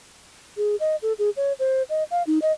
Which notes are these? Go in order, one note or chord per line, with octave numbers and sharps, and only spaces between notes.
G#4
D#5
A4
G#4
C#5
C5
D#5
F5
D#4
D#5